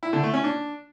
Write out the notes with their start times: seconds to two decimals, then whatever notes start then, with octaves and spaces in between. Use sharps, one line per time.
0.03 E4
0.13 D3
0.23 A3
0.34 C#4
0.44 D4